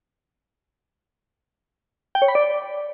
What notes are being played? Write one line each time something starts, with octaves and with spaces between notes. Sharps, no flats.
G5
C#5
B5
D5